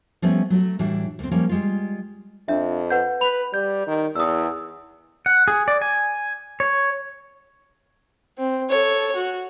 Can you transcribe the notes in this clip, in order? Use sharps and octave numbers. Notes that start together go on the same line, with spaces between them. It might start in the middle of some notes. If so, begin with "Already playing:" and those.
F3 G3 A3 B3 C#4
F#3 A3 F#4
A2 E3 G3 D4 F#4
D2 C4
F3 G3 A#3 C#4
G3 G#3 F4
F2 D4 E5
B4 F#5 G6
B4 B5 F7
G3 G6
D#3
E2 D#6 E6
F#5
G#4
D5
G#5
C#5
C4
A4 C#5
F#4